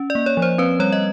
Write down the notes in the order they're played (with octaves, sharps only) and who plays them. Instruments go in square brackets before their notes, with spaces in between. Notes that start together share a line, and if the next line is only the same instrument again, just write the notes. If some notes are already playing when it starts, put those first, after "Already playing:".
Already playing: [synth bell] C#4
D5
A#3
C#5
F3
C5
C4 B4
G3 C#5
D#5